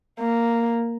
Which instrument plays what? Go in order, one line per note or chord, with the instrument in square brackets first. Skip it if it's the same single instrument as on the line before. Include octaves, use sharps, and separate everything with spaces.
[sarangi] A#3